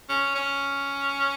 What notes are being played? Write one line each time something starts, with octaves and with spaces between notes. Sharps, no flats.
C#4
C#4